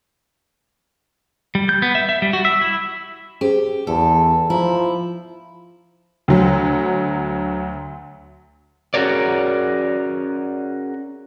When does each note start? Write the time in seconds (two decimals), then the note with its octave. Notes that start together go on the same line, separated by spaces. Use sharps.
1.55 G3
1.69 G6
1.82 B3
1.95 E5
2.09 E5
2.22 G3
2.33 F#4
2.45 E5
2.61 E4
3.41 C#4 G4 G#4 C5
3.87 E2 A4
4.50 F3 E4 A#5
6.28 D2 F#3
8.94 C#4 F#4 G#4 A#4 C#5 D5